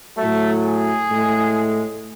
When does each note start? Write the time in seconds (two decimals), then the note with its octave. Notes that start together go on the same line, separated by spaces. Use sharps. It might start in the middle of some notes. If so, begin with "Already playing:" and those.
0.17 A2 F#3 A3
0.64 G#4
1.09 A2 G#3